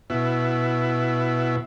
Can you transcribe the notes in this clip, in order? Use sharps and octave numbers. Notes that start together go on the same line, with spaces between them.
B2 E4